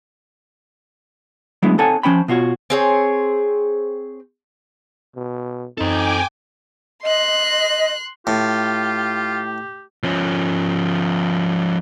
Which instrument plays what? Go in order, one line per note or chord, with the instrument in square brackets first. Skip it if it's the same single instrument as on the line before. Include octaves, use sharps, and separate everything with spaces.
[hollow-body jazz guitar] F#3 G#3 A3 B3 D4 E4
C4 D#4 A4 C#5 F#5 G#5
F3 C#4 C5 G5 B5
B2 F4 F#4 C#5
[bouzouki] C4 G#4 C#5
[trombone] B2
[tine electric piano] F#2 C4 [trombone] D#4 [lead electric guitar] A4 C5 [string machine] G5 G#5 D6
[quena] D#5 [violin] C6 F#6
[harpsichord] A2 [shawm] F4 [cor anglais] G4
[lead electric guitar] F3 C#4